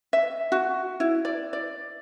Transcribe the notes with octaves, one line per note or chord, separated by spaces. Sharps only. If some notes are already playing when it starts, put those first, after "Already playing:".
E5
F#4
E4
D5
D5